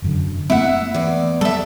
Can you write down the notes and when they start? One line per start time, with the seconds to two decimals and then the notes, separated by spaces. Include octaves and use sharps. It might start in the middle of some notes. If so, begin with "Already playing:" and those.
0.02 F1 F#2 D3
0.50 A3 A#3 C4 E4 E5 F#5
0.94 E2 D5
1.41 G3 A4 E5